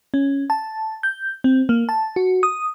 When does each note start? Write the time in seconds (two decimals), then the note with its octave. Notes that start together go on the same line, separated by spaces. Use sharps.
0.14 C#4
0.50 A5
1.03 G6
1.44 C4
1.69 A#3
1.89 A5
2.16 F#4
2.43 D#6